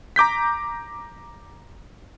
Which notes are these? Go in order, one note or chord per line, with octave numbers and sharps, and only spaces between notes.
A#5 D6 G6 B6